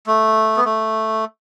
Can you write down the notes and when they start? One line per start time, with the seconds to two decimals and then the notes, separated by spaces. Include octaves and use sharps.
0.07 A3
0.56 B3
0.65 A3